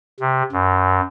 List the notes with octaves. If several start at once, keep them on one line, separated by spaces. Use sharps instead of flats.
C3
F#2